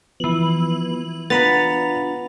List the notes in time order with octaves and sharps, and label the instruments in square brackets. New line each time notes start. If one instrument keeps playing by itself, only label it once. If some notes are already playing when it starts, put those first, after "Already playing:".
[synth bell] E3 F#7 [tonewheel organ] F3 B3
[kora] B3 [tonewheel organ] D4 F4 [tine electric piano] A#5 B5 A6 [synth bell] F7